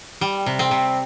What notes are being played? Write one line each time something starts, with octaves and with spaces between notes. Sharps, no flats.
G3
C3
C4
C3